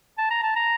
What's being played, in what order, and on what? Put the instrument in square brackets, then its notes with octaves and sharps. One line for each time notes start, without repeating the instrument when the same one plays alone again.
[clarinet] A5
A#5
A5
A#5